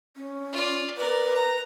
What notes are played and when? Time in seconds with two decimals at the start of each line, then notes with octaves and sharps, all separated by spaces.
0.16 C#4
0.53 F4 D5
0.97 A#4 B4 D5
1.33 A#5